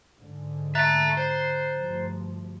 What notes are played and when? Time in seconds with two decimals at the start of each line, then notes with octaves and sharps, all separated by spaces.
0.20 G#2 D3 G#3
0.75 E5 A5 A#5 F#6 A6
1.17 C5
1.73 D2 G2 F3